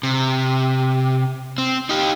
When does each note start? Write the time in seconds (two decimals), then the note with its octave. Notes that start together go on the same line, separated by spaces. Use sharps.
0.03 C3
1.58 C4
1.89 D#4 G4